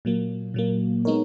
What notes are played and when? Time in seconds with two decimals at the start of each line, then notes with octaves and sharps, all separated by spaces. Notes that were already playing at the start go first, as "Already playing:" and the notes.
0.05 A#2 F#3 A#3
0.54 A#2 F#3 A#3
1.05 G#3 B3 D#4 A#4 C#5